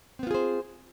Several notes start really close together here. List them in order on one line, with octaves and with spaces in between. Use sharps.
C4 B3 F4 G#4 C5